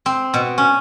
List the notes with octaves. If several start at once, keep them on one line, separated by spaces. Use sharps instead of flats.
C4
B2
C#4